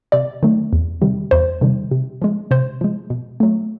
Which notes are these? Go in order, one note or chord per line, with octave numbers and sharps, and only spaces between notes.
C3 D5
D#3 F#3 A3
E2
C3 D#3 G3
E2 C5
C3 D#3 G3
C3
F3 G#3
C3 C5
F3 G#3
B2
F#3 A3